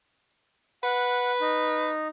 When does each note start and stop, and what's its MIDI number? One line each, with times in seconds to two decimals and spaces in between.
0.83 1.92 71
0.83 1.31 78
1.41 2.08 63